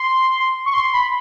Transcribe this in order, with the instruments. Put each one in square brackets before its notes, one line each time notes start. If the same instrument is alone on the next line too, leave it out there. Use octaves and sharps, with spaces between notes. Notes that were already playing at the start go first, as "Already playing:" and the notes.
Already playing: [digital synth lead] C6
C#6
C6
B5